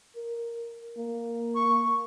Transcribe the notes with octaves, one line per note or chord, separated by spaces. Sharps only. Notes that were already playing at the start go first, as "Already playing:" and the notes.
A#4
A#3
C#6